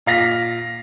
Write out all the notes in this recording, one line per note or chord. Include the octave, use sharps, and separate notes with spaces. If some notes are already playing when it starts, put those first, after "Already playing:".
A#2 F5 A#6 B6